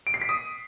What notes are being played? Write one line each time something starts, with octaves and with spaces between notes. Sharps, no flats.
D7
C7
B6
D#6